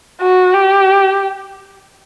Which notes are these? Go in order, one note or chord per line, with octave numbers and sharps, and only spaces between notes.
F#4
G4